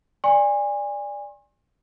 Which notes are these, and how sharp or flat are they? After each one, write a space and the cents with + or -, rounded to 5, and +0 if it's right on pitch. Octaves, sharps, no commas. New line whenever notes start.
D5 +0 G#5 -25 C6 +40